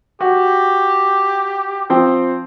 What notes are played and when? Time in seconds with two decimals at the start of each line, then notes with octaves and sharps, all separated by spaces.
0.21 F#4 G4
1.90 F3 C4 G5